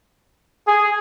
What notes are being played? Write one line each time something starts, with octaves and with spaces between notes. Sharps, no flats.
G#4